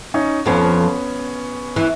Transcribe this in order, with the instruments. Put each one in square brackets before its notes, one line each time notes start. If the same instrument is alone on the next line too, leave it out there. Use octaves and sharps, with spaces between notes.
[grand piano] C#4 D#4
[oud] F2 F3 [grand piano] B3 C#4
[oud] E3